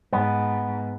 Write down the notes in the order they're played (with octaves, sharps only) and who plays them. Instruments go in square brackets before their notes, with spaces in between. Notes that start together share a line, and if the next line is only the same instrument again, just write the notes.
[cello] G#2 [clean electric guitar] B3